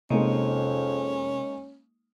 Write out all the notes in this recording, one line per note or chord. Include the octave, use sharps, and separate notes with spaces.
F2 C3 G#3 A#3 C#4 D#4